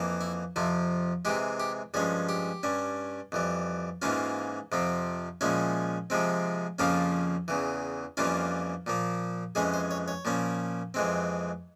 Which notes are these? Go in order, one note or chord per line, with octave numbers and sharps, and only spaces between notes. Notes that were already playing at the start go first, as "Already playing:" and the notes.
Already playing: F2 E3 A#3
E4
F2 C3 F3 E4
C3 E3 G#3 G4
G4
G2 F3 G#3 C#4 G#4
G4
G2 G3 C#4
F2 E3 G3
G#2 E3 A#3 C#4 F4
F2 C3 F3 C4
A#2 F3 G#3 C#4 E4
C3 F3 G#3 C4
F2 C#3 F3 A#3 C#4 F4
E2 C#3 E3
F2 E3 G3 A#3 C#4 F4
A#2 F3 A#3
F2 E3 G#3 C#4 G#4
C5
C#5
C#5
A#2 F3 A#3 C#4
F2 E3 G#3 C4